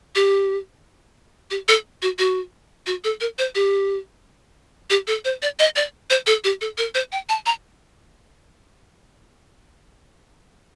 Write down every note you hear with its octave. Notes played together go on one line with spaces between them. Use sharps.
G4
G4
A4
F#4
F#4
F#4
A4
A#4
C5
G4
G4
A4
C5
D5
D#5
D5
C5
A4
G4
A4
A#4
C5
G5
A5
A#5